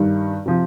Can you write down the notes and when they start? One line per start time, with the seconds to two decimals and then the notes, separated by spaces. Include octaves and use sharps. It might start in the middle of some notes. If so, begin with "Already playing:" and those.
Already playing: G2 D#3 G3
0.46 C3 F3